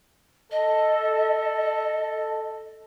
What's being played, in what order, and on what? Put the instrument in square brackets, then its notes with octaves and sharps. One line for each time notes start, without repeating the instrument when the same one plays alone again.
[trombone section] A4 [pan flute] D#5